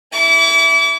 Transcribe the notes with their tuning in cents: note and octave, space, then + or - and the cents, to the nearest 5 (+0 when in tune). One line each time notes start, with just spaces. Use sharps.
E4 +0 D6 -40